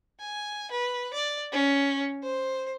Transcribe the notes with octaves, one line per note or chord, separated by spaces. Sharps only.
G#5
B4
D5
C#4
C5